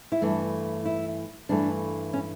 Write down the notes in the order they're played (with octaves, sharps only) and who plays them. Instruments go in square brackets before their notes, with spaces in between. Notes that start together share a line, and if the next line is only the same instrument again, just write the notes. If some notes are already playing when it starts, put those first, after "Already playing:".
[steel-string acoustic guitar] E4
G2 E3 A3 D4
E4
G2 E3 A3 D4
C#4